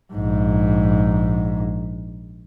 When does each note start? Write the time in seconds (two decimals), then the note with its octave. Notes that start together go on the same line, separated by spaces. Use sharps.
0.13 A#1 G#2